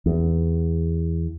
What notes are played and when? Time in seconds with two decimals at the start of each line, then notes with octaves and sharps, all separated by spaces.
0.06 E2